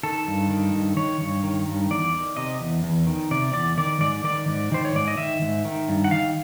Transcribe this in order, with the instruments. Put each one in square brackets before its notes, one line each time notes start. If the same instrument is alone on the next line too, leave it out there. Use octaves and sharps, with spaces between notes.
[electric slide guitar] D#3 A4
G2
D#3
G2
D#3 C#5
G2
D#3
G2
E2 D5
D#3
C3 D#5
E2
E2
D#3
C3 D5
E2 D5
D#3 D5
G#2 D5
D#3 D5
G#2
D#3 C5
C#5
G#2 D5
D#5
D#3 E5
G#2
D#3
G2
F#5
D#3 F5